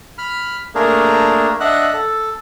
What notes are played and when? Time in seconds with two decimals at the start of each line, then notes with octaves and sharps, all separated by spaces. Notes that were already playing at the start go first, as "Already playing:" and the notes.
0.18 B5 F6
0.75 A3 A#3 D4 G#4 A#4
1.60 D4 D#5 E5 F#5 F#6
1.93 A4